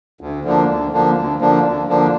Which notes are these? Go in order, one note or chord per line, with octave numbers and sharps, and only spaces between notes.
D2
D3 F3 A#3 D4
D2
D3 F3 A#3 D4
D2
D3 F3 A#3 D4
D2
D3 F3 A#3 D4